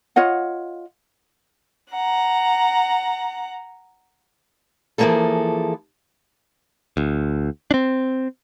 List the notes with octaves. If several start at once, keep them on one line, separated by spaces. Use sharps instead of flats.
F4 C#5 D#5 F#5
F#5 A#5
E3 F3 G#3 A#3 G#4 A4
D2
C4 D4